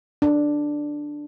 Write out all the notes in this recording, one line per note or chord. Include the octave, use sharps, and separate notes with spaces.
D4